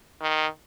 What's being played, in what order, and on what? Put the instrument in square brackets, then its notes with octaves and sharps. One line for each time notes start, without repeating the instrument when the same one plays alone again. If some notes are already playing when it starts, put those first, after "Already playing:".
[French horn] D#3